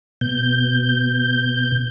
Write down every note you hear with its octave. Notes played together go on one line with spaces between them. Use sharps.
B2 G6